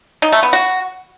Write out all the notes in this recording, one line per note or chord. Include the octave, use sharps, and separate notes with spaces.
D#4
A3
B3
F#4